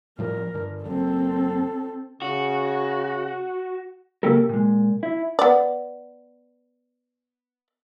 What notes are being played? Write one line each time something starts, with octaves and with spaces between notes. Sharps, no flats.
A2 F3 G3 A#4
G2 D3
F#1 F#2 C4 A4
C#3 F#4
C#3 A#3 C#4 G4 A4 A#4
A#2 G#3
E4
B3 D5